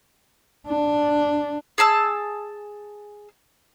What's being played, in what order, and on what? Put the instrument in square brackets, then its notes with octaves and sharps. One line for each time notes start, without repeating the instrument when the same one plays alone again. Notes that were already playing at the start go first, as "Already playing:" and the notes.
[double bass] D4
[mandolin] G#4 G#5 A5 E6